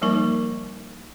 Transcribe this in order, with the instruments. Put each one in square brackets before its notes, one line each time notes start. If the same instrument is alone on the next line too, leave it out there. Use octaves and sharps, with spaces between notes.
[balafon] F3 G3 A#3 D#4 A#4 C#6